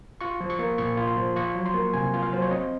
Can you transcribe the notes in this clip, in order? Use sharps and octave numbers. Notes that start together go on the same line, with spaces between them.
F4 C#6
F3
C#6
A#3
A#2 C#6
F4
C6
F3
F4 C#6
F#3
C6
A#3
C3 G#5
F4
F5
F#3 C5
C#5
C4 D#5